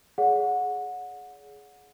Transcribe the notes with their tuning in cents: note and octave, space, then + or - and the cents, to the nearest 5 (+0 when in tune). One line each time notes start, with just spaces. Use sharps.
G#4 +20 C#5 +45 F#5 -25